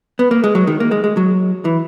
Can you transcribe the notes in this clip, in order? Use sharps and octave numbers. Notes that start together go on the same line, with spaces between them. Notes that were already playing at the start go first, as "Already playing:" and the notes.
B3
A#3
G#3
F#3
D#3
A#3
G#3
G#3
F#3
E3